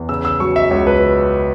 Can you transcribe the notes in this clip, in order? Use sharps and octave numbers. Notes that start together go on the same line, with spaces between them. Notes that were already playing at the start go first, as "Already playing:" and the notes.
Already playing: E2
C#3 E6
E6
F#3 C#6
E5
C#2 C#5
B4